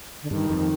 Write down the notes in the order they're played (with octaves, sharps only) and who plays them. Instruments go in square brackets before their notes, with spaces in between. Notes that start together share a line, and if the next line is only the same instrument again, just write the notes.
[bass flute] D3
[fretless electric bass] G2 [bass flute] D#3
[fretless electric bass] F2
[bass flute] D#3